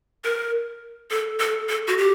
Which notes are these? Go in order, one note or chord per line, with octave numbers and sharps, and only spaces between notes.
A#4
A4
A4
A4
F#4
G4